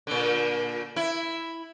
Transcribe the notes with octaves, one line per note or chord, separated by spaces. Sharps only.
A#2 D3
E4